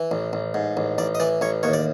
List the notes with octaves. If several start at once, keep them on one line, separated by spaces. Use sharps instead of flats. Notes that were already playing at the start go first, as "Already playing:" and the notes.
Already playing: E3
A1
A1
G#2
A1
A1 D5
D#5
E3 D5
A1 C#5
D#2 C#5
D5